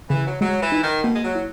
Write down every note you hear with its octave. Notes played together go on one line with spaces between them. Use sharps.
C#3 E3
F#3
F#3 G#3
E3
D#4
D#3
B2 A#3
G#3
F#3
E4